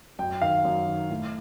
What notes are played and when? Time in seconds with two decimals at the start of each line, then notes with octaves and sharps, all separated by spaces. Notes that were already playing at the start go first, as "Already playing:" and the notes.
0.19 F#2 G5
0.42 D#3 F5
0.65 F#2
0.87 D#3
1.10 A2